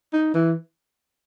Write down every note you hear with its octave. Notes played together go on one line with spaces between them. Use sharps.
D#4
E3